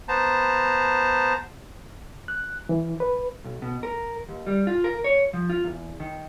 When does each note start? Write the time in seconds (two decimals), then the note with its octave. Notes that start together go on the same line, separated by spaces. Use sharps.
0.08 B3 C5 A5 A#5
2.28 F#6
2.69 E3
3.00 B4
3.44 B1
3.62 B2
3.83 A#4
4.29 D#2
4.46 G3
4.67 F4
4.84 A#4
5.04 C#5
5.33 F3
5.49 F4
5.64 E2
6.00 D#3